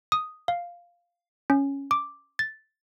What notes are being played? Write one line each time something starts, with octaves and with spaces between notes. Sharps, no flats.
D#6
F5
C#4
D6
A6